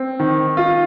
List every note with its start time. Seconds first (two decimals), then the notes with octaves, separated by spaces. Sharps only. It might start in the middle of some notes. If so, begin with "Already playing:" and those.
Already playing: C4
0.19 D#3
0.57 F4